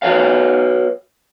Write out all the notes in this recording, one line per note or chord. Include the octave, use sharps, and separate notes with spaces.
F#4 B4 C#5 F5